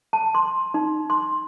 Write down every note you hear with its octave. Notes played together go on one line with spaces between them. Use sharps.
A5
C6
D#4
C6